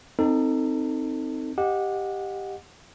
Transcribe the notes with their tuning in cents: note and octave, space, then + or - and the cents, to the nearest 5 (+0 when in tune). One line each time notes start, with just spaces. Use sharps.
C4 +0 D#4 +0 A4 +25
G4 +0 D#5 +0 F#5 -25